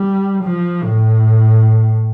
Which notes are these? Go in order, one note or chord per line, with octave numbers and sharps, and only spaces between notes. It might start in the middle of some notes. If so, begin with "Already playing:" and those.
Already playing: G3
F3
A2